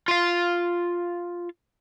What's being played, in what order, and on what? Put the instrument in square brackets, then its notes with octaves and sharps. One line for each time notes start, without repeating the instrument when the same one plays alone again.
[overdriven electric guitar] F4 F5